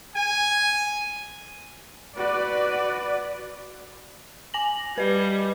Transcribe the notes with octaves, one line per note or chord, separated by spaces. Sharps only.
G#5
F#4 B4 D5
G#5 A#6 F#7
G3 B4 D#5